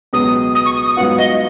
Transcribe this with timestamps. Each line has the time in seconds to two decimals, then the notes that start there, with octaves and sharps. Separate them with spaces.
0.13 C#2 B2 F#3 B3 D#6
0.55 D#6
0.65 C#6
0.76 D#6
0.86 D#6
0.97 G#2 F#3 B3 F4 F#5
1.18 D#5